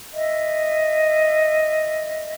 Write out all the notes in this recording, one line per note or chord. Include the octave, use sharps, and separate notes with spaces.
D#5 E5